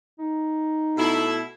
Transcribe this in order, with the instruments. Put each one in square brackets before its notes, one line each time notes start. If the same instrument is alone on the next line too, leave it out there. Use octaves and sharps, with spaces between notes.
[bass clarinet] D#4
[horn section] B2 A3 E4